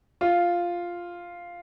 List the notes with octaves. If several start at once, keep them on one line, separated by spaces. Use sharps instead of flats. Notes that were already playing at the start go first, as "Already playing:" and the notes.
F4